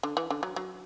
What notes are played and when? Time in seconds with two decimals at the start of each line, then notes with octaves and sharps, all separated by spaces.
0.03 D3
0.17 E3
0.30 D3
0.43 F#3
0.56 F#3